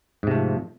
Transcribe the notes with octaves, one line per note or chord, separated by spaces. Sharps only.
G#2 C3 F3 A3